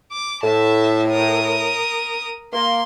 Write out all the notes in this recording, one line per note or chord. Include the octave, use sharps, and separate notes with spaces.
D6
A2 E5 A5
A#4 D#6
A#3 C6